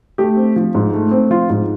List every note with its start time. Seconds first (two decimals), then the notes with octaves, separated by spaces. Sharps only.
0.18 A3 G4
0.36 C4
0.56 F3
0.75 G#2
0.93 A3
1.11 C4
1.30 F3 F4
1.50 G#2